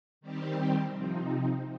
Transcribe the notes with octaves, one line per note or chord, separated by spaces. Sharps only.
D#3 G3 C4 G4
C3 F3 C4 D#4